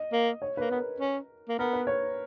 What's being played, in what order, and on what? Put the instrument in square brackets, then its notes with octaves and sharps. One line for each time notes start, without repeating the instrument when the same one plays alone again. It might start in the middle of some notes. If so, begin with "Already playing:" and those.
Already playing: [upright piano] D#5
[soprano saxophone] A#3
[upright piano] C#5
[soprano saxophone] A#3 [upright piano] B4
[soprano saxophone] B3 [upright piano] A#4
[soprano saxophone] C#4
A#3
[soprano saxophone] B3 [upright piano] A#4
[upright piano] B4
C#5